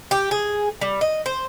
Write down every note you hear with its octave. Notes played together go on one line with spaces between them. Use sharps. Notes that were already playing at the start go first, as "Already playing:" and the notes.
G4
G#4
G3
D#5
C5